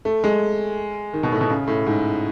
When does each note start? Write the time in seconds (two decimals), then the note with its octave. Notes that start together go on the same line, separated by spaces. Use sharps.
0.05 A3
0.24 G#3
1.13 D#3
1.23 B2
1.32 A2
1.41 B2
1.50 C#3
1.68 A2
1.86 G#2